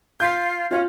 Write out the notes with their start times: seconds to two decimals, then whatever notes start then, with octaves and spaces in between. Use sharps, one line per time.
0.20 F4 G6 B6
0.71 C#4 F4 F5